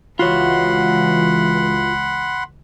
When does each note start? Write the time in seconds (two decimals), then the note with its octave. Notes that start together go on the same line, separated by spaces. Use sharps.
0.19 C#2 E3 F4 F#4 C#5 F#5 B5 C6